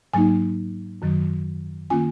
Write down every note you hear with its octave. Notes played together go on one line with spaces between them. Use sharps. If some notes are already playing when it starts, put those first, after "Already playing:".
G#2 F#3 A#3 D#4 G#5
F#2 D#3 F#3
D#3 A#3 C#4 F4 G#5